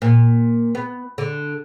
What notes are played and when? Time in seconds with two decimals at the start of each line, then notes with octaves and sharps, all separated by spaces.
0.02 A#2
0.75 B3
1.18 D3